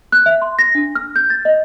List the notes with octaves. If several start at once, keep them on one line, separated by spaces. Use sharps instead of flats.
F#6
E5
C6
A#6
D4
F6
G6
A6
D#5